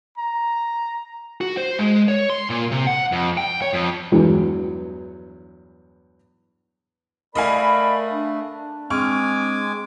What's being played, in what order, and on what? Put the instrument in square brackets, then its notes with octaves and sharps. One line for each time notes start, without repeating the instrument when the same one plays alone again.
[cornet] A#5
[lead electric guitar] F#4
C5
G#3
C#5
C6
A#2
C3
F#5
F2
G5
C#5
F2
[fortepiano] E2 G2 E3 F#3 G#3
[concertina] A3 [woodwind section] A#4 D5 B5 [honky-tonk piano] D#5 F5 G#5
[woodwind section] D4
[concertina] G#3 G#5 D6 [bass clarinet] C4 [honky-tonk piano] C#6 F6